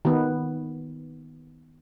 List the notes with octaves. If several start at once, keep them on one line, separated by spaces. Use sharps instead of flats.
D#3 B3